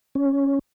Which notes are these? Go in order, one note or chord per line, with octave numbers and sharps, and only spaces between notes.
C#4